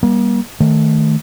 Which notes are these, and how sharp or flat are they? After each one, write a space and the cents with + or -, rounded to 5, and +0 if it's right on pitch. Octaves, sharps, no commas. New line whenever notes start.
G3 +0 A#3 +40
D#3 +0 A3 +0